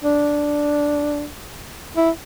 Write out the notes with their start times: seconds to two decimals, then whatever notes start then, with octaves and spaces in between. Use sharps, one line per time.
0.04 D4
1.97 E4